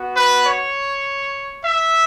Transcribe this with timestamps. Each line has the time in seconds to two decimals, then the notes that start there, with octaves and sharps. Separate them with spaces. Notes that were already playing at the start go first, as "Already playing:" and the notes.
Already playing: B3 F#4
0.16 B4
0.44 C#5
1.64 E5